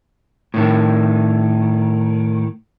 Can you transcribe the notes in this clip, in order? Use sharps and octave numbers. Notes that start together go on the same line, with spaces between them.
A2 D#3